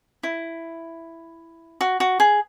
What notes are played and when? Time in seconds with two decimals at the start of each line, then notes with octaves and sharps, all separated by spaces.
0.23 E4
1.81 F#4
2.00 F#4
2.20 G#4